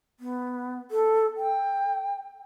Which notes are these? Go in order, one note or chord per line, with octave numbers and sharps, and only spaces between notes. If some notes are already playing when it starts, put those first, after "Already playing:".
B3
A4
G5